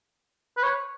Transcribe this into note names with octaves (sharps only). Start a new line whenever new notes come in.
B4
C#5